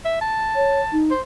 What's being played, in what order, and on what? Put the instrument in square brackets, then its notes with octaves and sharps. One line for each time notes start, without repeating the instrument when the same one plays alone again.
[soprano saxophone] E5
A5
[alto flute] C#5
D#4
[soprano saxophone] C5